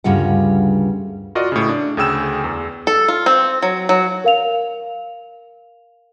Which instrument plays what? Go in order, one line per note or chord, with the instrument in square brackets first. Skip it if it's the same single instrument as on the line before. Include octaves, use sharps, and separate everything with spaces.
[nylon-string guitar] D2 G2 C#3 G3 F4 F#5
[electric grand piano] F4 F#4 A#4 D5 D#5
A2 C#3
D4
D2 C#3 G#4 G5 E6 E7
E2
[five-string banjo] A4
F4
C4
F#3
F#3
[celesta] A#4 F5 F7